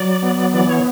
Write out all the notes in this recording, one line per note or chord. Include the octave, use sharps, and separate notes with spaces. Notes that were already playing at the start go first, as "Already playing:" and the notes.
Already playing: F#3 D5
B3
E3 D5
C#5